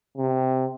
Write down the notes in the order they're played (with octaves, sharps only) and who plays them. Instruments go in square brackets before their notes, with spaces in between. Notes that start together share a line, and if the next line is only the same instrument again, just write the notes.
[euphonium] C3